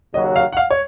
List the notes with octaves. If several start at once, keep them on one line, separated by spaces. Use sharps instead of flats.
D#2 C#3 F#3 D#5
F5
F#5
F5
C#5